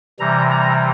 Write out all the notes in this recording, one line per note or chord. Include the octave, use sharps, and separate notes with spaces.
C3 E3 G3 A#5
A#5